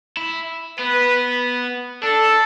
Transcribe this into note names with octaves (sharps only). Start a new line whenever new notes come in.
E4
B3 B4
D4 A4